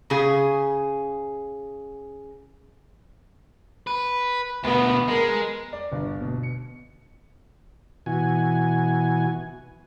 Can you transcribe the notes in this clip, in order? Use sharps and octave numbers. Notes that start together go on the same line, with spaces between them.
C#3 G#4
B4
D2 B2 B3
G#3 A#4
D5
G1
B2
C#7
B2 E3 F#4 G#5